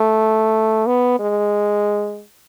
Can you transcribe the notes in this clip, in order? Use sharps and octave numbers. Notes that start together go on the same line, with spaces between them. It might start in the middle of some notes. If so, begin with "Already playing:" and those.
Already playing: A3
B3
G#3